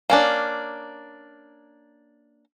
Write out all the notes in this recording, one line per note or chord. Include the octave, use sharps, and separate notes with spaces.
A#3 C#4 D4